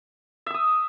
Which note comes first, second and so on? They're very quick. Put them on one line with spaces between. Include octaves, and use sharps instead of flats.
E5 E6 D#6